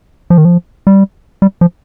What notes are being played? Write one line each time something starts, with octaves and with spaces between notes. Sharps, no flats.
F3
D#3
F3
G3
G3
F3